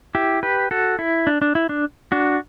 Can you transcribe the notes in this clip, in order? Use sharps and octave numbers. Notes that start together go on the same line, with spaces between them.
E4 G4
G4 B4
F#4 A4
E4
D4
D4
E4
D4
D4 F#4